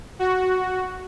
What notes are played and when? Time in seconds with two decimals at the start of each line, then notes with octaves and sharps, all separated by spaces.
0.19 F#4